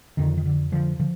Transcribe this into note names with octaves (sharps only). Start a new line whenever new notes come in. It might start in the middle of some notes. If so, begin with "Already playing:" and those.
F2 D3 D#3
D#3
D3
D3 F3
D3 F3